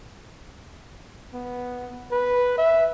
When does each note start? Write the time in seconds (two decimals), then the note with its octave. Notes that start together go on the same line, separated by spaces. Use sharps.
1.34 B3
2.12 B4
2.58 E5